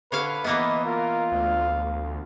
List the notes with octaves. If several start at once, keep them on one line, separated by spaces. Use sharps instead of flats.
D3 B4 C#5 F5
E3 A#3 B3 D#5
F4 A#4
D2 F5